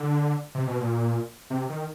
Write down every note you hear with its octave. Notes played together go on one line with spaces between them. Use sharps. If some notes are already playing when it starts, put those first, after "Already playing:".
Already playing: D3
C3
B2
A#2
C3
D#3